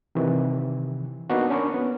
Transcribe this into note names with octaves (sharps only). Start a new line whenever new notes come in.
C3 D#3 E3
A#3 B3 D4 D#4 F#4
C#4 D4 A#4 B5 C#6
B3